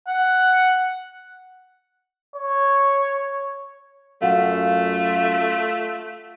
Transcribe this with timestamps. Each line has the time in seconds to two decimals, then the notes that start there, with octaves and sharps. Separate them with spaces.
0.07 F#5
2.36 C#5
4.22 F#2 A3 F4 F5 F#5